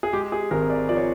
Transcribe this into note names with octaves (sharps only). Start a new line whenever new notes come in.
G#4
G#3 G4
G#4
G#1 A#4
D5
F3 D5
C#5